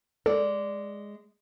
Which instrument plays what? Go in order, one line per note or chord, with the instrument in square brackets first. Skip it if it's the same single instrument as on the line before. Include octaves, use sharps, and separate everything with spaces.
[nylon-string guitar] G#3 D5 [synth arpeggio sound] A4